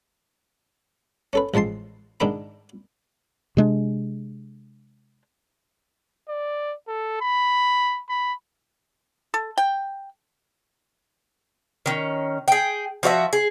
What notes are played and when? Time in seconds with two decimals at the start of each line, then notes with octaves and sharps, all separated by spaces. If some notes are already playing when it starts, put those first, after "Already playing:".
1.33 C#4 A4 B4
1.54 A1 F3 G#3 A5 C6
2.20 G#2 D#3 D4 D#4 B5
3.57 C3 G#3 D4
6.28 D5
6.88 A4
7.21 B5
8.09 B5
9.34 A4
9.58 G5
11.86 D#3 C#4
12.48 G#4 G5
13.03 F3 F#4 C#5 E5
13.33 G#4